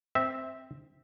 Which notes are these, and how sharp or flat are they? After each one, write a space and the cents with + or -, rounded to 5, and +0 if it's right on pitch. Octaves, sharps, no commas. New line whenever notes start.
C4 +0 E5 -10